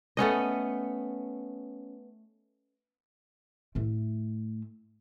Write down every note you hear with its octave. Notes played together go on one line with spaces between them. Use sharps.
A3 B3 C#4 D#5
A2 A3